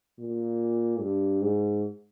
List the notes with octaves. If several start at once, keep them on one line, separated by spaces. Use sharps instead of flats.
A#2
G2
G#2